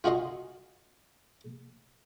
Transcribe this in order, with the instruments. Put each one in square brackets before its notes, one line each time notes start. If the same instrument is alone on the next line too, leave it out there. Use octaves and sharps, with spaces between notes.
[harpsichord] F4 F#4 G#4 D#5 C6